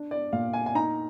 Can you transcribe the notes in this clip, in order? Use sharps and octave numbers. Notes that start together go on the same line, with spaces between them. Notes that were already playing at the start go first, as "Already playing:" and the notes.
Already playing: D4
D5
A#2 F5
G#5
G#5
D#4 A#5